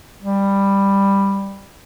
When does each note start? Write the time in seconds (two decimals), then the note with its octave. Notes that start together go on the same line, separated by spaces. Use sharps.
0.22 G3